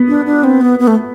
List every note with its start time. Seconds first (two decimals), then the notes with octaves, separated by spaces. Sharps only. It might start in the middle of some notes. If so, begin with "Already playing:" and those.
Already playing: B3
0.08 D4
0.26 D4
0.44 C4
0.61 B3
0.79 B3
0.87 A3